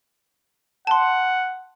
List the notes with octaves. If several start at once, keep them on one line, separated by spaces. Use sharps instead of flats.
F#5 A5 C6